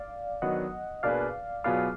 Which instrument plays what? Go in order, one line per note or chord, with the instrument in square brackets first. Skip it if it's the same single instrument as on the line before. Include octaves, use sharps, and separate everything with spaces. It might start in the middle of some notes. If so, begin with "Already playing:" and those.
Already playing: [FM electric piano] D5 F5
[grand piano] D#3 F#3 B3 D4 F#4 [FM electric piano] D#5 F#5
[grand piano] B2 A#3 D4 G#4 B4 [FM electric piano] D5 F5
[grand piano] B2 F#3 B3 F4 G#4 [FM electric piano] D5 F5